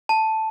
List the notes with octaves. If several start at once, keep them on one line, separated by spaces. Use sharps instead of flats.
A5